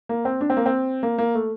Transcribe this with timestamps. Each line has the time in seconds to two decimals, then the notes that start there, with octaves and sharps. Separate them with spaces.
0.09 A#3
0.25 C4
0.41 D4
0.50 C4
0.57 A#3
0.66 C4
1.03 A#3
1.18 A#3
1.35 A3